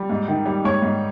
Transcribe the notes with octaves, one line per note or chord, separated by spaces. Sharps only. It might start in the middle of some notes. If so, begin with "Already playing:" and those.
Already playing: G3
G#2
D#3
G3
G#2 C#5
G#2